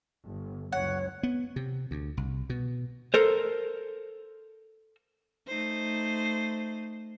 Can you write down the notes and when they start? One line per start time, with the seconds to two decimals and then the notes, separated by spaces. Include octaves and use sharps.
0.24 G1
0.72 F#1 C#2 C#5 F#5
1.23 B3
1.56 C3
1.91 D2
2.17 C2
2.50 B2
3.14 A4 A#4 C5
5.47 A3 D#4 C5